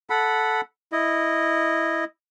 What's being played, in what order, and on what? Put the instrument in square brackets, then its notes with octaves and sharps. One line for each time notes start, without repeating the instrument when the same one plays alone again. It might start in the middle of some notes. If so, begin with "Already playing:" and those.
[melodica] A4 F#5 B5
E4 D#5